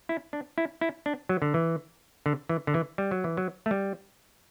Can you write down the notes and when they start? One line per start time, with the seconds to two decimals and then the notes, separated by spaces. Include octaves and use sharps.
0.09 E4
0.33 D4
0.58 E4
0.81 E4
1.06 D4
1.29 F#3
1.42 D3
1.54 E3
2.26 D3
2.49 E3
2.67 D3
2.74 E3
2.98 G3
3.11 F#3
3.24 E3
3.37 F#3
3.66 A3
3.71 G3